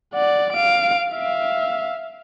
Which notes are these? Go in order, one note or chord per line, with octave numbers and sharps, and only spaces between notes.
D5 F#5
F5 D7
E5 F5